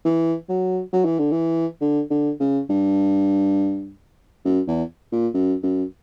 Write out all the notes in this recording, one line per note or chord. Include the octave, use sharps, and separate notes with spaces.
E3
F#3
F#3
E3
D3
E3
D3
D3
C#3
G2
F#2
E2
A#2
F#2
F#2